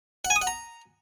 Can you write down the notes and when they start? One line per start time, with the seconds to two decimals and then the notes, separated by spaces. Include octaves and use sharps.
0.25 F#5
0.30 G#5
0.36 D#6
0.41 F#5
0.47 A#5